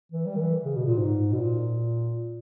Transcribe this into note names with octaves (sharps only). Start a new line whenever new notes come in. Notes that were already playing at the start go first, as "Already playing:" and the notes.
E3
G3
D#3
E3
C#3
B2
A#2
G#2
B2
A#2